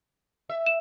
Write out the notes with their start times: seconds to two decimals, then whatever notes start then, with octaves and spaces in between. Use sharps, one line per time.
0.49 E5
0.66 E7